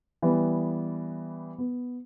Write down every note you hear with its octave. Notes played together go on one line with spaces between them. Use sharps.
E3 G3 B3
B3